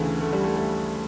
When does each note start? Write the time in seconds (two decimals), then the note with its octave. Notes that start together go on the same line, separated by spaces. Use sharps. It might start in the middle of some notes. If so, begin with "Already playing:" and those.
Already playing: D2 C#3 E3 A3
0.21 A3
0.33 G3
0.44 A3
0.56 A3